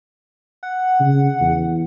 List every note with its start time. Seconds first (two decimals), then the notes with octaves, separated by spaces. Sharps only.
0.63 F#5
1.00 C#3
1.41 E2